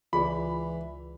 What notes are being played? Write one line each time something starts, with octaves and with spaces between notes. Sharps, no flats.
C#2 E3 F4 G#4 D5 B5